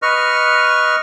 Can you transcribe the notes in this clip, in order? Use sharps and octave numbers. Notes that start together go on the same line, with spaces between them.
B4 D#5 C#6 F6